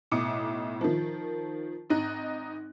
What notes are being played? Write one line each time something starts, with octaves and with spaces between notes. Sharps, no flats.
B1 A2 D6 D#6 C#7
D#3 F3
G#1 D#4 F#6